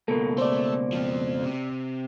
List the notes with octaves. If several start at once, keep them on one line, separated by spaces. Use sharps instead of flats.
C#2 B2 A#3 A4 A#4
A3 C5 D5
F3 C4
C3